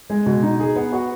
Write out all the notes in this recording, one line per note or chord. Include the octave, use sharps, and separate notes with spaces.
G#3
B2
D#4
G#4
B3
F#4